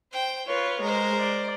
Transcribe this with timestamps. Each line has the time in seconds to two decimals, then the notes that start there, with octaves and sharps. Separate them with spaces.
0.12 C5 G5
0.47 F4 B4 C#5
0.82 G#3 A#4 C5
1.18 D5